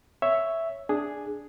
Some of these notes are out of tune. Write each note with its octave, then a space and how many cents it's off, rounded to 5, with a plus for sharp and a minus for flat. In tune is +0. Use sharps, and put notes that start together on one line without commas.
C#5 +0 E5 +0
D4 +0 G#4 +0